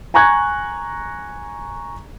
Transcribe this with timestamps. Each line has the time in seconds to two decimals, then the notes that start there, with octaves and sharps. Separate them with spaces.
0.14 G#5 A#5 C#6 F#6 G#6